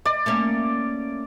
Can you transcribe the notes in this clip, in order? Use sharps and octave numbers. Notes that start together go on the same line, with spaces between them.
D5 D#5
A3 A#3 C#4